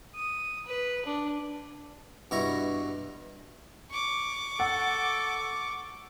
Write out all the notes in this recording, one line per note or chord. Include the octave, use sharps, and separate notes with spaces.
D#6
B4
D4
G2 B2 E4 A#5 C#6
C#6 D6
A4 F#5